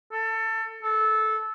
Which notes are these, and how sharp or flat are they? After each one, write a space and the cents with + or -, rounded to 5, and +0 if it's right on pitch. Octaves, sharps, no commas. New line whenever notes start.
A4 +20
A4 -15